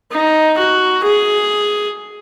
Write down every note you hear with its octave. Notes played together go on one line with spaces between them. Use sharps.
D#4
F#4
G#4